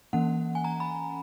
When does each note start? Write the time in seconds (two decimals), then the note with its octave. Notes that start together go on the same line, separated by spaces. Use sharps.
0.13 E3 A#3 C#4 F#5
0.55 G#5
0.64 A#5
0.80 B5